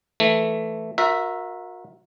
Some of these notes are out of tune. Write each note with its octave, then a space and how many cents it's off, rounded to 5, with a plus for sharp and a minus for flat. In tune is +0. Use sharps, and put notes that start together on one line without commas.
E3 +0 A3 +0
F#4 -40 A#4 +5 E5 +0